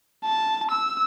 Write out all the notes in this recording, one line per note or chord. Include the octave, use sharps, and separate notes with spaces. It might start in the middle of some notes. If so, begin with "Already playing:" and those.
A5
E6